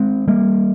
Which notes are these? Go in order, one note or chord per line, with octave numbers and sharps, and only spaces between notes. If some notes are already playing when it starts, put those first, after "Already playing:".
Already playing: G#3 C4
G3 A#3